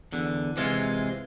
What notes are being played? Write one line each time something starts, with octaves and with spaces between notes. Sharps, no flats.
E2 D3
C3 E3 G#3 F4